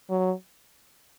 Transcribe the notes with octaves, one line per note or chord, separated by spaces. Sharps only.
F#3